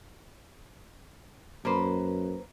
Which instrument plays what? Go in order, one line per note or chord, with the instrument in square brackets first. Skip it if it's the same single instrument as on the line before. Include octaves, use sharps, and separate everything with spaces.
[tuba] F#2 [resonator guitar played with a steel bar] A#3 B4 C5